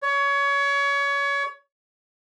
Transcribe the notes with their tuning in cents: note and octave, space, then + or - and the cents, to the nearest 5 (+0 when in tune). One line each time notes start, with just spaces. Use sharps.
C#5 +25